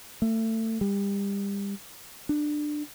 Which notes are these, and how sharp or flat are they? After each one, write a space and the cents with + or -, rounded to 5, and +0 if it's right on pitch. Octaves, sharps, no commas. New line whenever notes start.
A3 +25
G3 +30
D4 +20